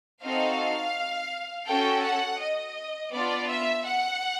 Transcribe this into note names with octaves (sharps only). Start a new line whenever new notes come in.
C4 D#4 F#4 A4 F5
C#4 F#4 A4 G5
F#5
D#5
B3 D4 F4 D5
E5
F#5